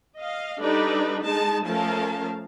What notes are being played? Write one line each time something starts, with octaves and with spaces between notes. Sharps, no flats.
D#5 F5
G3 D4 D#4 A4 B4 D5
G#3 D#4 A5
F3 A3 C#4 A#4 F5 A5